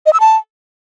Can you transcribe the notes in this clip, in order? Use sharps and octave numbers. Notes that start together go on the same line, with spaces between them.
D#5
E6
A5